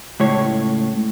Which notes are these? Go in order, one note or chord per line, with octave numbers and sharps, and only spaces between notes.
C#2 A2 C#5